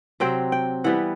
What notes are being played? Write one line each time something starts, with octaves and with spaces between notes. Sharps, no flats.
C3 F#3 C4 G5
G5
E3 G3 B3 F#5